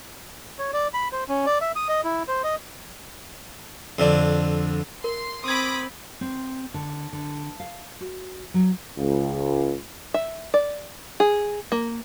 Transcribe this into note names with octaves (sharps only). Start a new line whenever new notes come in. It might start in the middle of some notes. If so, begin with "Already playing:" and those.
C#5
D5
B5
C5
C#4
D5
E5
D#6
D#5
E4
C5
D#5
F2 D3 D4
A#4 C6
C4 B5 C6 D6 D#6 G#6
C4
D3
D3
F5
F#4
F#3
C#2
E5
D5
G#4
A#3